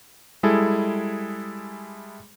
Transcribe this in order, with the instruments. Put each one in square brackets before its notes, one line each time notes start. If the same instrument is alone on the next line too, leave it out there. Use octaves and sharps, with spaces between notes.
[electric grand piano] G3 G#3 E4 G#4 A4